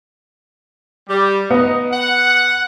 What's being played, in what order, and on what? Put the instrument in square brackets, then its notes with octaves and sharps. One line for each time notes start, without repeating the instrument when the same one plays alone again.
[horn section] G3
[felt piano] B3 [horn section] D#4
[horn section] F#5